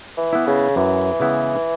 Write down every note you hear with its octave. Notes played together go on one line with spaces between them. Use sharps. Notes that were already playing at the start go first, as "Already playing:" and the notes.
E3
B3 E4
C#3
F#2 E3
C#3 G#3 B3 E4